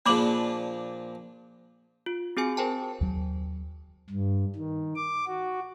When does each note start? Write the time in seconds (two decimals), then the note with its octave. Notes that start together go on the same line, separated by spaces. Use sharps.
0.06 A#2 F3 A#3 D4 G#4 B5 D6 F#7
2.06 F4
2.37 C4 F#4 G#4 G#5 C#7
2.57 G#4 A#4 C5 G5 A5
3.01 D#2 F#3
4.10 G2
4.56 D#3
4.96 D6
5.27 F#4